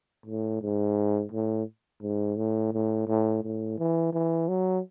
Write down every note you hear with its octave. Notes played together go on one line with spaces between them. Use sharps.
A2
G#2
A2
G#2
A2
A2
A2
A2
E3
E3
F#3